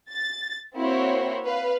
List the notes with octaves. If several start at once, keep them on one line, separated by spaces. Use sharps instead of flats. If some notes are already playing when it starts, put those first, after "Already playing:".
A6
A#3 C4 E4 F#4 C5 C#5
B4 F5